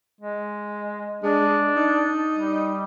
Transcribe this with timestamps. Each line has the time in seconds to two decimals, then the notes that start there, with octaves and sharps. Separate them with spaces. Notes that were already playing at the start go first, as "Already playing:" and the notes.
0.21 G#3
1.23 G#3 D4
1.76 D#4
2.35 G3